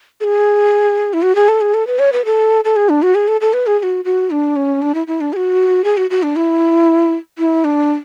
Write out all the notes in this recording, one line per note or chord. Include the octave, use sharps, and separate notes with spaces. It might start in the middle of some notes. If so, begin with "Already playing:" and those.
A4
G#4
E4
F#4
G#4
A4
G#4
A4
B4
C#5
B4
A4
A4
G#4
D4
F#4
G#4
A4
A4
B4
G#4
G#4
F#4
F#4
D4
C#4
D4
E4
E4
D4
G#4
F#4
G#4
F#4
F#4
D4
E4
E4
D4